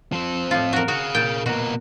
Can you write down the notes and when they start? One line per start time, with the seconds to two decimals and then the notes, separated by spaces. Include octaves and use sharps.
0.12 F3 C4
0.51 A2 F4
0.73 F#4 A#4
0.88 F#4 G#4 F5
1.15 A#2 G5
1.46 B2 A#3 F#4